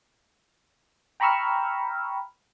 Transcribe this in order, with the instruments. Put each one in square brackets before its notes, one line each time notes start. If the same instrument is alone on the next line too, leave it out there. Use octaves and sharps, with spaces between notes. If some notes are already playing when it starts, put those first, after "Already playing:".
[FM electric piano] G5 A#5 B5 C#6 E6 F6